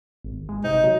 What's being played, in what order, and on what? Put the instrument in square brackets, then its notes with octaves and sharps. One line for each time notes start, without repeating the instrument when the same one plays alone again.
[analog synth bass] G#1
G#3
[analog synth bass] C3 [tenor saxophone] D#4
[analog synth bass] F#3